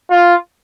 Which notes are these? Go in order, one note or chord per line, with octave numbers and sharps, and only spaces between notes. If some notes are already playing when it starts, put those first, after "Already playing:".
F4